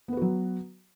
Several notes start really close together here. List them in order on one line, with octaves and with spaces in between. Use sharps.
B3 B4 F#4 F#3